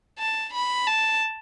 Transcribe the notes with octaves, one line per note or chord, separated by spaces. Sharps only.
A5
B5
A5